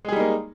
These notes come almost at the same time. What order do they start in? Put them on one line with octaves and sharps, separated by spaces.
G#3 G#4 G3 D#4 A#3